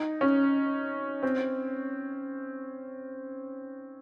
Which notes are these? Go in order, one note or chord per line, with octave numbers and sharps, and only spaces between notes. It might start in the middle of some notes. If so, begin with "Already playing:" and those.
Already playing: D#4
C#4
C4